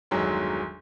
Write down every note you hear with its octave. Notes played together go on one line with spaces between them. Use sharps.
G1 E2 D#3 F#3 G#3 C6